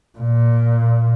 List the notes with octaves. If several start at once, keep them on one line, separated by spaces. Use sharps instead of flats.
A#2